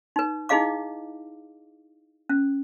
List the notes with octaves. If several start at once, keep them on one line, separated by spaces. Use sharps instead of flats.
D#4 B4
D#4 E4 G#4 D#5 F5 D6
C#4